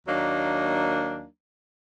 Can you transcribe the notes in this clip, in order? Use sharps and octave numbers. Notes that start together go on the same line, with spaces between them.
D#2 F#3 A#3 D4 D#4